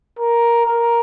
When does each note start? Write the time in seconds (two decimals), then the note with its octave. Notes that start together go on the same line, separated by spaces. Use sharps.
0.19 A#4
0.65 A#4